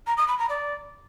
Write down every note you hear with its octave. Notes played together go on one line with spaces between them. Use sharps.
A#5
D#6
B5
A#5
D5